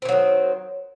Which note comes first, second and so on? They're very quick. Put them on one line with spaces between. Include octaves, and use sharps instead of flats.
C4 E3 F#3 D#3